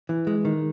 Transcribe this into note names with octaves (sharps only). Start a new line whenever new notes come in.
E3
G#3
D#3